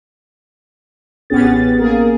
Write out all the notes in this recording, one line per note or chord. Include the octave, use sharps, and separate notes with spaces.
A1 B3 C#4 G4 G#4 A6
A#3 G#4 A#4